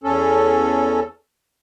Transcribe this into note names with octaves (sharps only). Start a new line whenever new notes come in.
E2 C#4 A4